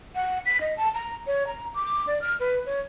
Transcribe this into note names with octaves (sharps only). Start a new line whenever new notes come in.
F#5
B6
D#5
A5
A#5
C#5
A#5
D6
D5
F6
B4
C#5